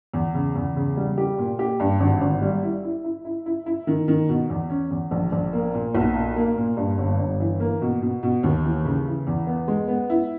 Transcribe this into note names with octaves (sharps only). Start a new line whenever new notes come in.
E2
C#3
E2
C#3
G3
G4
A#2
G4
G2
G#1
G#1
G3
E4
E4
E4
E4
E4
E4
D#3
D#3
B2
E2
C#4
E2
A#1
A#1
A#3
A#2
B1
A#2
A#3
A#2
G2
G1
G1
E3
A#3
B2
B2
B2
D#2
E3
C#3
E3
E2
B3
G#3
B3
E4